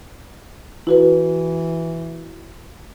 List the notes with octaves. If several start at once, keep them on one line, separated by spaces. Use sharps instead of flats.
E3 E4 F#4 B4